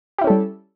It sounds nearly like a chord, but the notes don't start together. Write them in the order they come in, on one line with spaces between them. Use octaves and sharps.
G4 E4 C#4 A4 G3